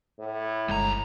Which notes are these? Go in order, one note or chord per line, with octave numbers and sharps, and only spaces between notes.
A2
G1 C#2 G#3 A#5